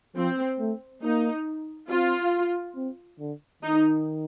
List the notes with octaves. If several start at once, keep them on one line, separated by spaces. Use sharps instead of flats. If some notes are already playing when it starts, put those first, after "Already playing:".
F3 C4
A3
A#3 D#4
C4 F4
C4
D3
D#3 D#4